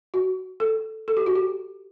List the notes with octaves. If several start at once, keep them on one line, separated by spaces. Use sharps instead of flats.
F#4
A4
A4
G4
F#4
G4